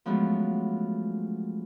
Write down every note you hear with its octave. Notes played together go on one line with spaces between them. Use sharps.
F3 F#3 G#3 A3 B3 C#4